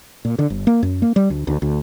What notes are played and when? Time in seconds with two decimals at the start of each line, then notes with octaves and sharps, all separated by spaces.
0.25 A#2
0.39 D3
0.50 G1
0.67 A#3
0.83 F#2
1.02 A#3
1.16 G3
1.30 D2
1.47 D2
1.62 D2